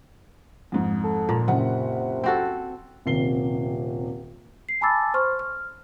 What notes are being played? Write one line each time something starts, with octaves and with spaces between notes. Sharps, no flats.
F2 G#2
A4
A#2
F#1 C3 F#5
C4 F#4 A4
D#1 C3 C7 G7
C7
G#5 A5 B5 D6 E6 A6
C5 C6 C#6 F6
F6